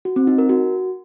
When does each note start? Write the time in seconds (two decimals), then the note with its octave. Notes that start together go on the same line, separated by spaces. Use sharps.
0.05 F#4
0.16 C4
0.27 D#4
0.38 A#4
0.49 F#4